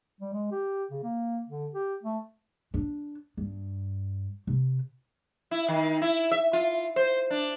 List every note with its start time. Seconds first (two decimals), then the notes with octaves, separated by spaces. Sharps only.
0.21 G3
0.33 G#3
0.51 G4
0.91 C#3
1.03 A#3
1.48 D3
1.73 G4
2.03 A3
2.74 D4
3.37 G2
4.47 C3
5.51 E4
5.68 D#3
6.02 E4
6.31 E5
6.53 F4
6.96 C5
7.30 D4